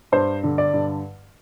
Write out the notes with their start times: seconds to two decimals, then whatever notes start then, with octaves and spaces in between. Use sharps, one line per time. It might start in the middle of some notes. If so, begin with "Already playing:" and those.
0.12 G2 C5
0.43 D3
0.58 D5
0.74 G2